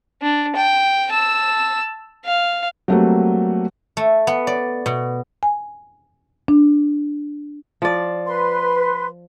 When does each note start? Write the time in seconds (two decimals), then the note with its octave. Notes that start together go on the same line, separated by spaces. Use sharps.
0.22 D4
0.56 G5
1.11 A5 E6
2.25 F5
2.88 F#3 G3 A3 A#3 C4 F#4
3.97 A3
4.27 B3
4.47 D5
4.86 B2
5.43 G#5
6.48 D4
7.82 F3 D5
8.26 B4 C6